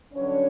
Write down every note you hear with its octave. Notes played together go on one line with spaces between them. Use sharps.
G2 D3 F#3 C#4 C#5